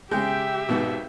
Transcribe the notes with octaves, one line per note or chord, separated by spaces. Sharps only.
C#3 G#3 G4 E5 G5 G6
G#1 G#2 B2